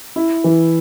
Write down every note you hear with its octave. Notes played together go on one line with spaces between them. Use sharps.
E4
E3